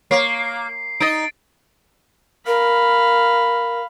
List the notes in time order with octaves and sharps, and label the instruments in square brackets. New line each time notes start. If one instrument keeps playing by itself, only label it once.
[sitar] A#3 [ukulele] C#5 [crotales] C7
[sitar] D#4 D#5 [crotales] A6 D7
[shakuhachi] A#4 [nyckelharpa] F5 B5